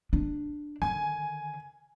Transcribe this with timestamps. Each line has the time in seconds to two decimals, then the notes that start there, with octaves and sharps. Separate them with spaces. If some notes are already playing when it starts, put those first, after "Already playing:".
0.13 D4
0.82 D3 D#3 G#5